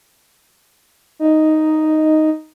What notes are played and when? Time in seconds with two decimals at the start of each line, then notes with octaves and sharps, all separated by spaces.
1.19 D#4